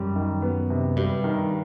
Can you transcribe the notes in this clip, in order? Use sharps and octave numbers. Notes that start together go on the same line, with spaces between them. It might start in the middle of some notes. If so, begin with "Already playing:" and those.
Already playing: F#2 G3
D#3
B3
C3
G2 G3
D#3